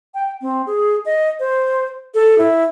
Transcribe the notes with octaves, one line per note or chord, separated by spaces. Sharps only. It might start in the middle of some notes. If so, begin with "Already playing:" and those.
G5
C4
G#4
D#5
C5
A4
E4